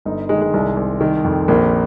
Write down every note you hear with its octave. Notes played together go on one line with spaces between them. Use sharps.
G1 D#4
D#3 G#3
G#3
C2
C2
D#3
F2
A#1 A#3